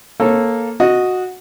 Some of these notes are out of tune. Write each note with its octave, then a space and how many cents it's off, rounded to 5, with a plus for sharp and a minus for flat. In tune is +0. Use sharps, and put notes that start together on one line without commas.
A#3 +0 A4 +0 C#5 -30
F#4 -10 D#5 +0